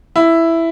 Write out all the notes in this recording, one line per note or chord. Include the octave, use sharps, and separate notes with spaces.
E4